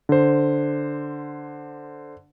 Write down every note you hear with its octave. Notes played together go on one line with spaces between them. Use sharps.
D3 C5